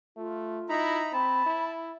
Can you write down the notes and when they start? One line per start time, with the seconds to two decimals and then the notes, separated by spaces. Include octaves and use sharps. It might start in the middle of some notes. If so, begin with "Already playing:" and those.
0.17 A3 F4
0.69 D#4 E4 A#5 B5
1.13 C4 A5 B5
1.46 E4